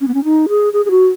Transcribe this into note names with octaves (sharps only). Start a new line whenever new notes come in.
C#4
B3
C#4
D#4
G#4
G#4
G#4
F#4